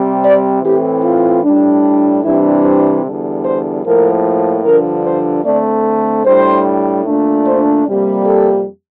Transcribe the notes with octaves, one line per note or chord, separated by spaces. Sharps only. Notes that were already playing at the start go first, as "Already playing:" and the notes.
Already playing: C3 G3 C4
D5
A2 E3 A3 C4 G4
F4
A2 G3 D4
C3 E3 G3 D4 E4
C5
E2 D3 G3
C5
A2 F3 A#3 A#4
G2 D3 F3 A#4
C5
D3 A3 C4 D5
A2 G3 D4 C5
A#2 A3 D4
C5
F2 C3 G3 A#3
A4